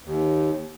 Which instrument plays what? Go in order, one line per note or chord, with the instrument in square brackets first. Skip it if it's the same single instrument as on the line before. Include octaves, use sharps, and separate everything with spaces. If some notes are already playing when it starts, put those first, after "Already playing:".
[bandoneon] D#2